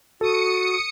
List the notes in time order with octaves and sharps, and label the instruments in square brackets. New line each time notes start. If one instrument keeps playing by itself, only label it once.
[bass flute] F#4 [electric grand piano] A4 [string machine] D#6 C#7